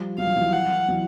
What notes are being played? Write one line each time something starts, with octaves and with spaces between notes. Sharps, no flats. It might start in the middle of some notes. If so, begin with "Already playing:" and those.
Already playing: F3 G3
F#3 F5
F3
E3 F#3
F#5
E3 F#3